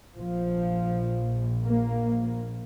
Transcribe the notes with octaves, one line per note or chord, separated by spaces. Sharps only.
A#1 A#2 F3
A#3